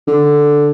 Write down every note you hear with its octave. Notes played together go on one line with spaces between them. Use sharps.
D3